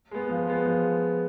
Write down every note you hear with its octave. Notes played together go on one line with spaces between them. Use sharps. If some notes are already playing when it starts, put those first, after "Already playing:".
G#3 B3
F3
G#3 B3
F3